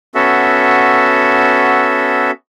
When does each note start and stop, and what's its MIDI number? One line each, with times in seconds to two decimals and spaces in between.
0.15 2.31 59
0.15 2.31 61
0.15 2.31 66
0.15 2.31 69
0.15 2.31 76
0.15 2.31 78